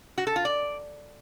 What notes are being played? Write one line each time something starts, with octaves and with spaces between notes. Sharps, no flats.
F#4
A4
F4
D5